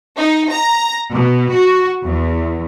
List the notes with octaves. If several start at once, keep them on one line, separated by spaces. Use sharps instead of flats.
D#4
A#5
B2
F#4
E2